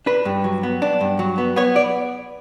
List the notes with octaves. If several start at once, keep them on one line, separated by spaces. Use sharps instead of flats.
D4 B4
G2
F#3
B3
D4
G2
F#3
B3
B3 C#5
D5